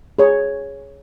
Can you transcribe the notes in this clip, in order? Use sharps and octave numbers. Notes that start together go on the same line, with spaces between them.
G#4 C#5